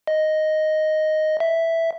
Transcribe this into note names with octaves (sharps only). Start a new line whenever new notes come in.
D#5
E5